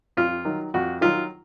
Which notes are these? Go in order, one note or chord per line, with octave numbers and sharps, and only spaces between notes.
F2 F4
D#3 F#3
F2 F#4
D#3 F#3 F4